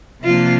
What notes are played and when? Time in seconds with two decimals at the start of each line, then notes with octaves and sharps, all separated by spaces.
0.23 C3 F3 A#3 D4 F4